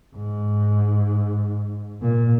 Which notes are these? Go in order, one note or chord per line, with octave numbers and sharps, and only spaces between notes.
G#2
A#2